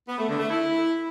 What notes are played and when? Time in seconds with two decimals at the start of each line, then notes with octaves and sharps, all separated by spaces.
0.07 B3
0.18 A3
0.29 D3
0.39 A3
0.50 E4